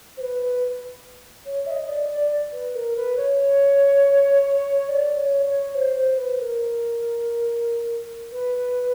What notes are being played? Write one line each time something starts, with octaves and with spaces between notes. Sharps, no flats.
C5
B4
C#5
E5
D#5
D5
D5
B4
A#4
B4
C#5
D5
C#5
C#5
C5
C5
B4
A#4
B4